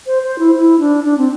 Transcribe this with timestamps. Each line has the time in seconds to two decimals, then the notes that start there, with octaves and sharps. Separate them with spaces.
0.06 C5
0.23 C5
0.39 E4
0.55 E4
0.79 D4
1.04 D4
1.17 C4